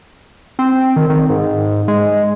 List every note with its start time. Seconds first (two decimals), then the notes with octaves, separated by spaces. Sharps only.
0.59 C4
0.96 D#3
1.10 D#3
1.30 G#2
1.88 G#3